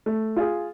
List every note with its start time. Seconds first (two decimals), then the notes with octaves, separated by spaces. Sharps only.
0.06 A3
0.36 F4 G#4